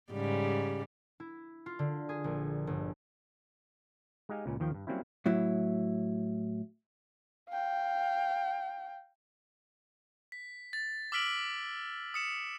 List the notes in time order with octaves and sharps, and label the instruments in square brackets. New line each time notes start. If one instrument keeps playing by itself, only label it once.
[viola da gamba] G#2 C#3 G3
[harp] E4
F4
D3
G#4
A#1
G1
[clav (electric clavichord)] G#3 D#4 G4 D#5 F5 G#5
C#2 A#2 C#4
D#2 D#3 F3 G5
G2
F#3 G3 A#3 C4 C#4 E4
[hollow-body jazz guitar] A2 F#3 E4
[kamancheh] F5 G5
[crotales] B6
A6
D6 E6 F6 B6 D7 F#7
D#6 C#7 E7